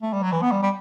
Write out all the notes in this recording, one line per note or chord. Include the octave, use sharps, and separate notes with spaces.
A3
G3
F#3
E3
B3
G3
G3